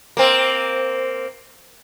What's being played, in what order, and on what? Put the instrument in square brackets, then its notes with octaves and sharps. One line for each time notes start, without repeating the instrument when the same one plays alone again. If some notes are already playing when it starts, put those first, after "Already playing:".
[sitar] A#3 C4